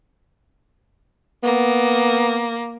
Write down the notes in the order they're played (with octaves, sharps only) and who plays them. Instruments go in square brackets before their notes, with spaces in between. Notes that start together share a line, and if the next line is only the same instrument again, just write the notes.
[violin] A#3 [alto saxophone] B3